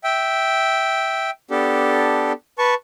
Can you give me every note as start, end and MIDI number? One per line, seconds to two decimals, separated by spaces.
0.04 1.30 76
0.04 1.30 79
1.51 2.32 59
1.51 2.32 62
1.51 2.32 67
1.51 2.32 69
2.58 2.74 71
2.58 2.74 81
2.58 2.74 85